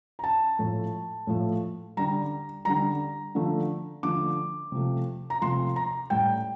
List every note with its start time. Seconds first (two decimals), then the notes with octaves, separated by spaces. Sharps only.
0.19 A#5
0.24 A5
0.59 A2 F3 A3
1.27 A2 F3 A3
1.97 D3 G3 A#5
2.65 D3 G3 A#5
3.35 D3 F3 A3
4.03 D3 F3 A3 D6
4.72 C3 F3 A3
5.30 A#5
5.41 C3 F3 A3 C6
5.76 A#5
6.10 A2 G3 G5